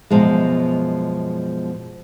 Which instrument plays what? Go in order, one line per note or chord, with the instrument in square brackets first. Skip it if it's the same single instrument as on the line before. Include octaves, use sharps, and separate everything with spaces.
[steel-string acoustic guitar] F#2 B2 F3 G#3